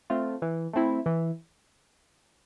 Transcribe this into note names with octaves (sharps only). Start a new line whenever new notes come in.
A3 C4 F4
E3
A3 C4 E4
E3